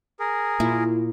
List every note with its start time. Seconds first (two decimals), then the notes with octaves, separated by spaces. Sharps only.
0.20 G#4 A#4
0.60 A#2 E4